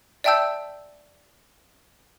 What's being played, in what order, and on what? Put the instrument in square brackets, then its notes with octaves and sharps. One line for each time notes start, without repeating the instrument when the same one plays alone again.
[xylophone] D5 E5 G5 A5 E6 G6